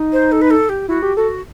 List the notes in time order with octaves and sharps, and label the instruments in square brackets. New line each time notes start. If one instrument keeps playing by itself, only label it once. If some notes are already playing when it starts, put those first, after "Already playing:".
Already playing: [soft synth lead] D#4
[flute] C5
A4
B4
A4
G4
[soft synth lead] E4 [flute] F#4
[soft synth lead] G4
[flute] F#4 [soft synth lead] A4